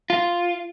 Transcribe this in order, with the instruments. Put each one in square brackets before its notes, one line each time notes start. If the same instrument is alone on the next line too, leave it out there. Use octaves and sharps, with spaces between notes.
[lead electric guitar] F4